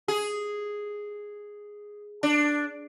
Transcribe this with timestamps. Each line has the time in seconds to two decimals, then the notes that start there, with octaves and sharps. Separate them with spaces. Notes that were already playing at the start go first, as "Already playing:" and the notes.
0.08 G#4
2.23 D4